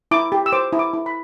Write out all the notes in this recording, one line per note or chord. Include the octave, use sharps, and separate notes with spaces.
E4 D6
G4
E6
C5 D6
E4
D6
E4
B5